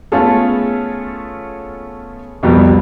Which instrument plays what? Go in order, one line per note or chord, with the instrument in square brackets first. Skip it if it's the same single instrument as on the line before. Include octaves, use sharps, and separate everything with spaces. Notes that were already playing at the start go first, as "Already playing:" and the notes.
[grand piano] A3 B3 C#4 F4 G#4 A4
C2 F2 B2 G3 B3